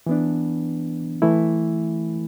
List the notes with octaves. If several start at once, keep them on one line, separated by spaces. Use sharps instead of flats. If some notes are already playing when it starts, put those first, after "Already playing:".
E3 B3 D4
E3 A3 E4